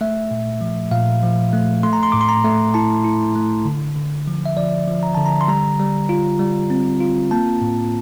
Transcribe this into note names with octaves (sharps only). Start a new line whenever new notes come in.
A3 E5
A#2
F3
A#2 F5
F3
A3
A3 C6
A#5
C6
A2 D6
C6
A#5
A3
E4 A5
E4
A3
D3
D3
F3
E5
F3 D5
F3
A#5
D3 A5
A#5
C6
G3 A#5
G3
F4
G3
C4
F4
A#3 A5
A2